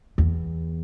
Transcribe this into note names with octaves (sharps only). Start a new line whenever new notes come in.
E2